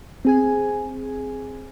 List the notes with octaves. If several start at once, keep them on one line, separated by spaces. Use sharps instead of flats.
C4 G#4 G#5